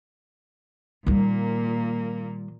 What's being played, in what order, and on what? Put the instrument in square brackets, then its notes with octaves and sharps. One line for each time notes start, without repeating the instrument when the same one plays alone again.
[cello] A#2 A#3 [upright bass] D#3 G3